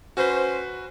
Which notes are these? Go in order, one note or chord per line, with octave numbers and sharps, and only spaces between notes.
C#4 F#4 B4 C5